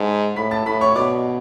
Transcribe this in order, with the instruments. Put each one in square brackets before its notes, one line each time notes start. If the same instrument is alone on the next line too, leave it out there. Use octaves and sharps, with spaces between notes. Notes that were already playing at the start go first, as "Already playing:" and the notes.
Already playing: [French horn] G#2 [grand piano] A5
[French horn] A2 [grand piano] B5 B6
[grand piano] A5 A6
[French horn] A2 [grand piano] B5 B6
[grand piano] C#5 C#6
[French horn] B2 [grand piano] D5 D6